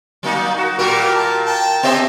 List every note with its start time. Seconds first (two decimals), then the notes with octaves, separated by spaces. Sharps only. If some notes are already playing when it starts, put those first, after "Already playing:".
0.23 F#3 A#3 D#4
0.58 F#4
0.79 A#2 G3 A#3 G4 A#4
1.15 A5
1.46 G5 A5
1.83 B3 G4 C5 D#5 E5